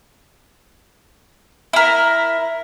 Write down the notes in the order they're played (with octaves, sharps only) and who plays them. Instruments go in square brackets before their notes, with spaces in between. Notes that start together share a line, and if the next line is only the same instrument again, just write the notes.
[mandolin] E4 A#4